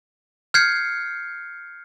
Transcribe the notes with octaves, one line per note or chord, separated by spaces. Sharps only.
F6 G6 G#6 C7 C#7